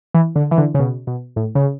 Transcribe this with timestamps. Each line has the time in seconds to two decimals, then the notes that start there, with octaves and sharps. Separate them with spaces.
0.14 E3
0.36 D3
0.51 E3
0.58 D3
0.74 C#3
0.80 B2
1.07 B2
1.36 A2
1.55 C#3